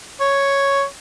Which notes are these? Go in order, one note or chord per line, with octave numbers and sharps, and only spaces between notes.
C#5